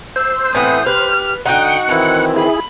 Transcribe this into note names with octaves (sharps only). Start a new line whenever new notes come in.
C5 E6
A2 E3 B3 C4 B4 D#6
G4 B4 F6
D3 D#4 F#4 F#5 G5
D#3 E3 C4 E4
E4 G#4 B5